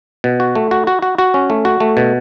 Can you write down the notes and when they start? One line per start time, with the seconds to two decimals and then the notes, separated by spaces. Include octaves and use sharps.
0.24 B2
0.40 F#4
0.55 A3
0.71 F#4
0.87 F#4
1.02 F#4
1.18 F#4
1.34 C#4
1.50 A3
1.65 F#4
1.80 A3
1.97 B2